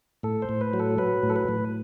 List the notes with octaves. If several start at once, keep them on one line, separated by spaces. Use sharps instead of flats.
A2 A4
C5
A2
B4
F#3
A4
F#3 B4
A2
A4
B4
A2